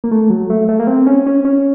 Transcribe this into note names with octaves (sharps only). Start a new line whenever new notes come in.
A#3
A3
F#3
A3
A3
A#3
C4
C#4
C#4
C#4